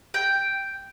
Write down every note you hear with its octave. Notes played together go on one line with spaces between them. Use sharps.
G5